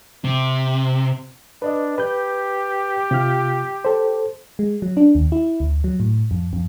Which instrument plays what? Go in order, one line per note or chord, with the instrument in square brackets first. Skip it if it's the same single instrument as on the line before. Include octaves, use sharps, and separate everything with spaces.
[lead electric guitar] C3
[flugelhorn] D4 [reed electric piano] B4 D5 D#5
[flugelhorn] G4 [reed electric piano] B4 G6
[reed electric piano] C3 F4 F6
A4 C5
[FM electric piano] G#3
F#3
D4
D#2
E4
D2
F#3
A2
F2
F2